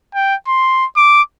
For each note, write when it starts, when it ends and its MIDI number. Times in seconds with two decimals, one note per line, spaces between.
0.15 0.35 79
0.48 0.86 84
0.97 1.22 86